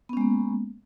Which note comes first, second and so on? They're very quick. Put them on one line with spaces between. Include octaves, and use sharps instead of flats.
B3 C#4 G#3 A#3